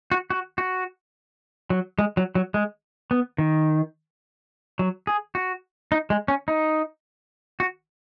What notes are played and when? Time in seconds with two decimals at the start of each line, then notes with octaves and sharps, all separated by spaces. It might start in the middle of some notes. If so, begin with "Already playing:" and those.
0.12 F#4
0.30 F#4
0.58 F#4
1.70 F#3
1.99 G#3
2.17 F#3
2.35 F#3
2.54 G#3
3.11 B3
3.38 D#3
4.79 F#3
5.07 G#4
5.35 F#4
5.92 D#4
6.10 G#3
6.28 C#4
6.48 D#4
7.60 F#4